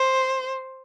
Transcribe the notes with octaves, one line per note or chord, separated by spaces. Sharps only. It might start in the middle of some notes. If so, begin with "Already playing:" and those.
Already playing: C5